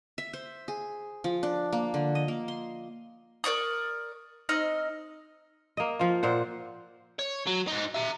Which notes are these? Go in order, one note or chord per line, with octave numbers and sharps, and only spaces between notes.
E5
C5
G#4
F3
D4
A#3
D3
D#5
A#3
C6
A#4 D5 C#6 D#6
C4 D#4 D#5 F6
A#3 D#5
F3 F4
A#2 C5 F#5
C#5
F#3
G#2 D#4
E5 A#5